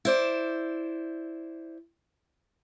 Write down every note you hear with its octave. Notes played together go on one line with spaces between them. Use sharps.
E4 C5 D5